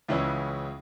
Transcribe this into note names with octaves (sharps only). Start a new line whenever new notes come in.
C#2 C#3 E3 C#4 E4